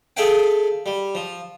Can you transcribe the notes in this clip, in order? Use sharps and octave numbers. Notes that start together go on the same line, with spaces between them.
G#4 A4 E5 F5 G5
G3
F3